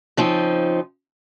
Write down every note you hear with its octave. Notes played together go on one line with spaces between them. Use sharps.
C#3 F3 C4 D#4